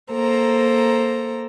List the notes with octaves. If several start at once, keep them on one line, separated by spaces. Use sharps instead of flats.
A#3 A4 C5 A#5